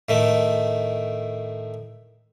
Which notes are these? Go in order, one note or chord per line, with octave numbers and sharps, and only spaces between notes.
A2 D#3 A3